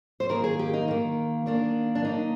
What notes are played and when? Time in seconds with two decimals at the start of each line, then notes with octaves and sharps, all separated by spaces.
0.20 C5
0.29 D#3 A#3 A#4
0.44 G#4
0.59 G4
0.73 D#4
0.88 D#3 A#3
1.46 D#3 A#3 D4
1.95 D4
2.04 D#3 A#3 D#4